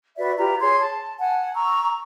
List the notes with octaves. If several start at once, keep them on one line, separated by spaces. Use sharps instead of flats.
F#4 B4 D5 E5
F4 G4 B4 A#5
G#4 C#5 C6 G#6
A5
F#5 G#5 A5
A#5 C#6 E6